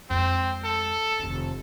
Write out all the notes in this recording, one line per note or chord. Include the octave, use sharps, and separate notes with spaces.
F2 G#3 C4
A4
F1 D#3